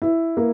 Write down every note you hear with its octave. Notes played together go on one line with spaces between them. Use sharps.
E4
A#3